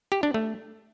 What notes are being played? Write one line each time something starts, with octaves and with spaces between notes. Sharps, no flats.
G4
D4
A3